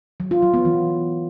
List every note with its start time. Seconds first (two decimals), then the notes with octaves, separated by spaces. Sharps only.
0.20 F#3
0.31 F4
0.42 F#3
0.54 B3
0.65 E3